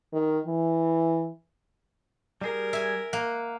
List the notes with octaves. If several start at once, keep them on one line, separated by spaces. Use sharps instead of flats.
D#3
E3
G3 G#4 A#4
E5 G#5
A#3 F#5